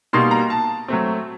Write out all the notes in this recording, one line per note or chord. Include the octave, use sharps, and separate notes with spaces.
B2 G3 A#3 D#4 C6
A#5
A5
F#3 A3 C4